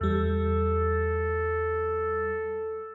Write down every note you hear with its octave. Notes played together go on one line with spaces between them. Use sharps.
E2 G3 A4